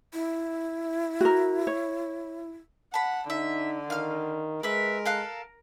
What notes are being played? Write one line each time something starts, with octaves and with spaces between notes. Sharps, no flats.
E4
F#4 A#4
C#5
F#5 A5 B5
D3 D#4 E5
D#3 F5 F6
G#3 A#4 B4 E5
A4 F5 F#6